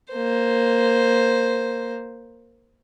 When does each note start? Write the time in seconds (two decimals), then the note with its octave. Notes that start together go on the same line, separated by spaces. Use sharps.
0.13 A#3 C5